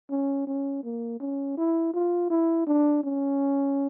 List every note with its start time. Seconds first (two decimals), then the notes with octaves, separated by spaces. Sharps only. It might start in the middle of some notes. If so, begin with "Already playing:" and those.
0.10 C#4
0.47 C#4
0.84 A#3
1.20 C#4
1.58 E4
1.94 F4
2.30 E4
2.67 D4
3.03 C#4